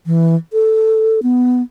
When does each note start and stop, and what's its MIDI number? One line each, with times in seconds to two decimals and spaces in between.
0.06 0.35 52
0.53 1.20 69
1.23 1.62 59